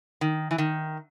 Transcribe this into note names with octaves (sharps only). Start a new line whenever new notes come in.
D#3
E3
D#3